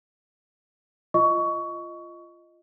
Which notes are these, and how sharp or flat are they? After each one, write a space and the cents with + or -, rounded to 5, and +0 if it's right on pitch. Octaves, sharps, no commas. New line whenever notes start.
F4 -15 D#5 +0 C#6 +20